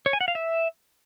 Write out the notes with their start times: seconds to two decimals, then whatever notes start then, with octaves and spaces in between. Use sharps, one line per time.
0.06 C#5
0.13 G#5
0.21 F#5
0.28 F5
0.35 E5